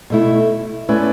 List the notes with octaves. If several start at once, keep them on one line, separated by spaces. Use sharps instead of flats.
B2 A3 E4
A3 C#4 E4 B4 D5